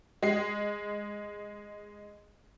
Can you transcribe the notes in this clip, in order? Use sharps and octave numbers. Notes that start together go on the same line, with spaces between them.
G#3 C7